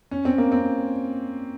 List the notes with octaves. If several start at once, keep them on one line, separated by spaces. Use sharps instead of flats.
C#4
C4
A#3
C4